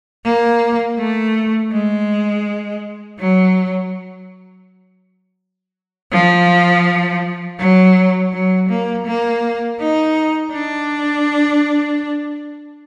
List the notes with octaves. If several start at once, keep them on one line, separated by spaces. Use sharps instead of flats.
A#3
A3
G#3
F#3
F3
F#3
F#3
A#3
A#3
D#4
D4